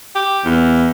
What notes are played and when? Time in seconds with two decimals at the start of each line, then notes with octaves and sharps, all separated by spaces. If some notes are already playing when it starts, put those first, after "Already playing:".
0.15 G4
0.45 E2